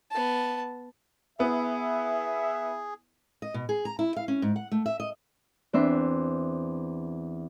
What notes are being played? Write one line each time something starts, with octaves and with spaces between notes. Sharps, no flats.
B3 A5
B3 E4 G#4 E5
D#5
B2
G#4
A#5
E4
F5
C#4
G#2
F#5
A3
E5
D#5
E2 C4 D4 E5 C6